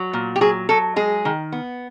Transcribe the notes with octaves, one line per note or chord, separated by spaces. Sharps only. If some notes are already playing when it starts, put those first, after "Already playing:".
Already playing: F#3
A#2
G4
F#3 G#4
F#3 A4
G#3 G#4
D#3
B3